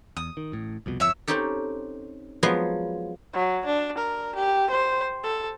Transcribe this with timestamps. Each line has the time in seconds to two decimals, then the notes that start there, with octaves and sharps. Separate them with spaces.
0.17 E2 D#6
0.37 D#3
0.52 A1 A2
0.86 C2 F2 B2
1.00 G1 F2 C#5 E5 E6
1.27 C4 C#4 D#4 G4 A4
2.43 F3 F#3 G#3 B3
3.33 F#3
3.66 D4
3.98 A#4
4.35 G4
4.70 C5
5.23 A4